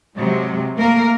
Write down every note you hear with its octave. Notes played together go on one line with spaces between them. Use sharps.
C3 F#3 G#3
A3 A#3 A#4